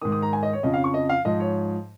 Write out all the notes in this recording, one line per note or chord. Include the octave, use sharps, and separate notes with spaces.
G#2 D#3 D#6
D#6
A#5
G#5
D#5
C#5
F2 C#3 F3 D#5
F5
C#6
D#5
F5
G#2 F3 D#5
C#5